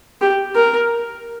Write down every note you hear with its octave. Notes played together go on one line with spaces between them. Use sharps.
G4
A#4